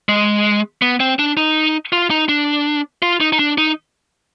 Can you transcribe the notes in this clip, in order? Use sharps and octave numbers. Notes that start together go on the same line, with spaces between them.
G#3
B3
C4
D4
D#4
F4
D#4
D4
F4
D#4
D#4
D4
D#4